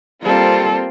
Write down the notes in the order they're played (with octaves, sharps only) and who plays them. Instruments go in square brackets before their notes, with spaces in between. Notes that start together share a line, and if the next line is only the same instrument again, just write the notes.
[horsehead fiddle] G3 A4 [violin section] A#3 C4 F4